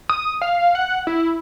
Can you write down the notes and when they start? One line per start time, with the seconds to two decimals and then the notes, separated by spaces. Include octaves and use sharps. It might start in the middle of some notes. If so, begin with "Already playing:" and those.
0.09 D#6
0.42 F5
0.75 F#5
1.07 E4